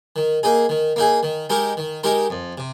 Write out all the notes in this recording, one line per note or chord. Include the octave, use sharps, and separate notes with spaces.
D#3
A#3 D#4 G#4
D#3
A#3 D#4 G#4
D#3
G#3 D#4 G4 A#4
D#3
G#3 D#4 G4 A#4
F2
C3